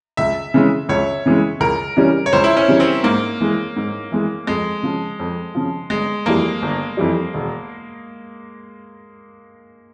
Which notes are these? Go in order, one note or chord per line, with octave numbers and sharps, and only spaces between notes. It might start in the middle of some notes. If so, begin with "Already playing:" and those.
C#2 E5
C#3 E3 G#3
C#2 C#5
C#3 E3 G#3
C#2 A#4
C#3 E3 G3 C#4
C#5
C#2 C5
E4
C#4
C#3 E3 G3 C#4
C4
G#2 A#3
E3 G#3
G#2
E3 G#3
F2 G#3
C#3 F3
F2
C#3 F3
G1 G#3
F2 E3 G3 A#3
G1
F2 E3 G3
E1